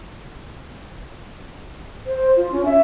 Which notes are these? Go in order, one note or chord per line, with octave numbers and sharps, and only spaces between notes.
C5
F4
C#4
E5